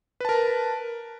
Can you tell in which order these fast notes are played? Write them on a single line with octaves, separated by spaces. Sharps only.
B4 A5 A#4